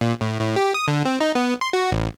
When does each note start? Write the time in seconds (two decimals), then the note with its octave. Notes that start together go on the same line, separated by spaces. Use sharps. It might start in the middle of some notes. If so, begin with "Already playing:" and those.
0.01 A#2
0.21 A2
0.39 A2
0.56 G4
0.74 D#6
0.88 D3
1.05 C4
1.21 D#4
1.35 B3
1.61 C6
1.73 F#4
1.92 A1